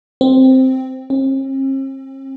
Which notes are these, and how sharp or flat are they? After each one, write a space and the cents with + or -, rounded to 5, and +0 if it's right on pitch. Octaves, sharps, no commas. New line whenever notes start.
C4 +0
C4 +45